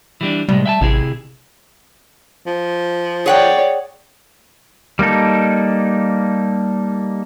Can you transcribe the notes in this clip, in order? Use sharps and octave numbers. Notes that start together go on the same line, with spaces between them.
E3 G3 D4
A2 C3 G3 G#3
E5 G5 A5
A1 C3 E4 G#4
F3
G#4 C#5 D5 F#5 G5
G3 A#3 D#4 A4